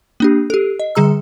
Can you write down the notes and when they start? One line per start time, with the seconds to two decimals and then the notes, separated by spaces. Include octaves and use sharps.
0.20 A#3 D4 G4
0.50 G4 A4
0.79 D#5
0.95 D3 G3 G#4 A#5 E6